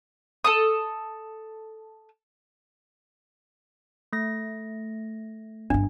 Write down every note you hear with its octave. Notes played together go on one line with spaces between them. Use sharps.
A4 A5 D#6
A3 A#6
G1 G2 D4